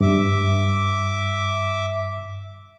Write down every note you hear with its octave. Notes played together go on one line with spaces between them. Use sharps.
G2 E5 D6